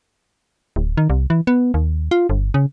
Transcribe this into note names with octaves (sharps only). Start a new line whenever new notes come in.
D1
D#3
C2
E3
B3
D#2
F4
G1
C#3